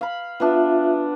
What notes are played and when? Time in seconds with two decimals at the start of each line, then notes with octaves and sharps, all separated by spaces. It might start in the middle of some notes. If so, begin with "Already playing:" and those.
0.01 F5 B5
0.40 B3 D4 F4 E5